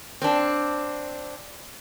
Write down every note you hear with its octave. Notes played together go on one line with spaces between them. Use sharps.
C4 D4